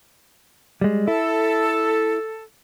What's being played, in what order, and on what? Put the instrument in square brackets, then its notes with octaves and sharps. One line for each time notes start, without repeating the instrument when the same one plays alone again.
[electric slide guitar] G3 G#3
[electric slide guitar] E4 [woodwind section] A4